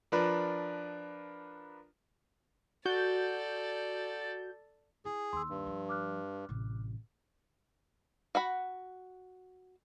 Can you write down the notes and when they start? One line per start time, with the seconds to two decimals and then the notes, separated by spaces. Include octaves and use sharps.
0.12 F3 D4 A#4 B4
2.85 F#4 A4 D5 G6
5.05 E4 G#4
5.33 D#2 C6 E6
5.49 G2
5.67 F3
5.89 D6 F6 F#6
6.49 A1 C3
8.35 F#4 F#5 B5